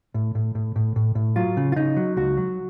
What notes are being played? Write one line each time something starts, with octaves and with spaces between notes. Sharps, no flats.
A2
A2
A2
A2
A2
A2
F#3 F4
C#3
F4
C#3 D#4
F#3
C#2 F#4
F#3